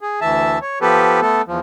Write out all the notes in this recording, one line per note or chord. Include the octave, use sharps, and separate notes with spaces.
G#4
D2 E3 E5 A5
C#5
F3 B3 G4 A4 B4
A3 B3 A4
E2 F3